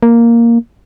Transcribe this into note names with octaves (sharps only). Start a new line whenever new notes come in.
A#3